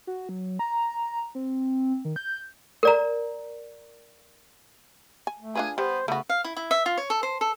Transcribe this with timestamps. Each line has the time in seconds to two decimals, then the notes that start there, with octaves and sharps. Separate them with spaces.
0.07 F#4
0.29 F#3
0.59 A#5
1.35 C4
2.05 D#3
2.16 G6
2.83 A#4 D5 A#5
5.27 G#5
5.39 A3
5.55 D4 F4 G#4 B4 G#5
5.78 G3 B3 C5
6.08 C#3 A3 B3 F#4
6.29 F5
6.44 E4
6.57 E4
6.71 E5
6.86 F4
6.97 C#5
7.10 A4
7.23 C5
7.41 A4